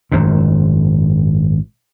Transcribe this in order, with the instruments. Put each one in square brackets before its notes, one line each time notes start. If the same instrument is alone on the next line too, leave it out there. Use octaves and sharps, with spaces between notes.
[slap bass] G#1 F#2 A#2